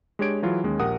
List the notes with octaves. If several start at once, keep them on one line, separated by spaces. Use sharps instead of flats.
G#3 D4 G4 C#5 G#6 D7
E3 F#3 F4 G#4
D#2 G#3 C#4
A#1 G4 A#4 F#5 D#6